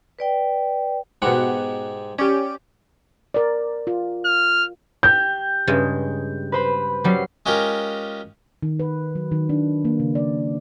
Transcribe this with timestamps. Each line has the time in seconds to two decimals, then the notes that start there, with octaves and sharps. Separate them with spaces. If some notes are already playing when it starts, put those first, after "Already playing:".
0.19 B4 D5 G5
1.22 G#2 B2 G#3 G4 F#5
2.19 C#4 G4 D5
3.34 A#4 D5
3.87 F4
4.25 F6
5.03 G4 G6
5.67 G2 C#3 G#3
6.52 B4 C5 B5
7.04 F#3 G3 C#4 G4 C7
7.46 G#3 C#4 F4 G4 A#4
8.63 D#3
8.80 B4
9.15 F#3
9.32 D#3
9.49 D4
9.85 A#3
10.00 C#3
10.15 D5